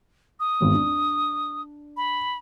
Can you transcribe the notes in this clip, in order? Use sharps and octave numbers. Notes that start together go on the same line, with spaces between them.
D#6
G#1 E2
D4
B5